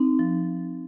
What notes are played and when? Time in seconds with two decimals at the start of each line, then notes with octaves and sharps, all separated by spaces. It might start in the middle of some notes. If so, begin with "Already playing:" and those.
Already playing: C4 D#4
0.19 F3